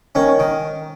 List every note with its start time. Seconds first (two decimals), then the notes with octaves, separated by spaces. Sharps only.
0.15 D#3 C#4
0.39 D#3